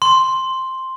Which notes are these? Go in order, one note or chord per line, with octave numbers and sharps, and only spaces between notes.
C6